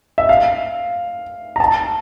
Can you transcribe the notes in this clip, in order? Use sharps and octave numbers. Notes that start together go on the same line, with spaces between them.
E5
F5
A#5
A5